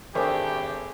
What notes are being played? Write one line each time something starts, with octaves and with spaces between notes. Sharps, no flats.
G#1 A3 D4 G4 G#4 A#4 C5 E6